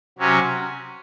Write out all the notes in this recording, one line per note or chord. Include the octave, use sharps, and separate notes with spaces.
C3 F#3 C#4